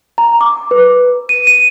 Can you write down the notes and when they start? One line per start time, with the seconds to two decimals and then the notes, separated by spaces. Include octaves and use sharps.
0.18 A#5
0.41 D6
0.71 B4
1.29 D#7
1.47 D#7